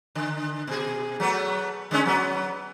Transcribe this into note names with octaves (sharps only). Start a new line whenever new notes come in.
D3
B2 G#4
F#3 A3 B3
D3 G#3 C#4
F#3 B3